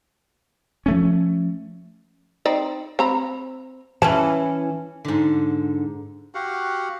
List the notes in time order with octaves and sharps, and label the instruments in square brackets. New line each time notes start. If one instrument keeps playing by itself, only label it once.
[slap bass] F3 A3 C#4
[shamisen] C4 D#4 D5
C4 A#5 B5
[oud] E3 C#4 B4 [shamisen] A5
[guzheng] G#2 D3
[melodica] F#4 G4 F5 F#5